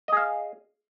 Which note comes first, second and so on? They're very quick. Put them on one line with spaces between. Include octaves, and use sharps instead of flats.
D#5 G#4 F5